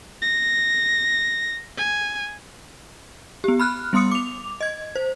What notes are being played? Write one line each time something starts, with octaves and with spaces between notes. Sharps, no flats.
A#6
G#5
B3 G4
B5 F6 F#6
G3 B3 C6 D#6 C#7
D6 F7
D#5 G#6
C5